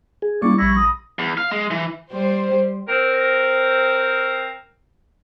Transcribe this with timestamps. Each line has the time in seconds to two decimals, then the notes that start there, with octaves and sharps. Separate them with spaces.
0.22 G#4
0.42 G3 A#3 C#4 E4 D5 C#6
0.59 A#1 E4 B5 A#6
0.77 D#6
1.19 E2
1.38 F5
1.51 G#3
1.71 E3
2.12 G3 C5
2.88 C4 A#4